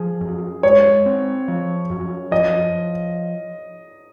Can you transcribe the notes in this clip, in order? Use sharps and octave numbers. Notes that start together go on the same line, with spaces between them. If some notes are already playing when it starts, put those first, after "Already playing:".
Already playing: F3 G#4
F#2
G#3 C#5
C4
F3
F#2
F3 D#5